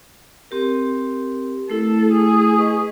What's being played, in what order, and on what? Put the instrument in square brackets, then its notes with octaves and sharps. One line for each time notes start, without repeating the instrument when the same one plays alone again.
[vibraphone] C4 G4 A#4
[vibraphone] A3 E4 [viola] A4
[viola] G#4
[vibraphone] B4 D#5 C#6